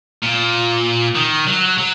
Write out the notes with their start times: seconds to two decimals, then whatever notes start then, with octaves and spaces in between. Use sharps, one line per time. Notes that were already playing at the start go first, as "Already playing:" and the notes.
0.23 A#2
1.16 D#3
1.47 F#3
1.78 F#3